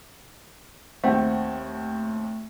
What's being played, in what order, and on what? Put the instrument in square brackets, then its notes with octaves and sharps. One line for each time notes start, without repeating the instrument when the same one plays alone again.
[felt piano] D#2 C4 [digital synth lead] A3 [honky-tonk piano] F#5 G5